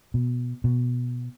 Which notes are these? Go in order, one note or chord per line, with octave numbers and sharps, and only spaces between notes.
B2
B2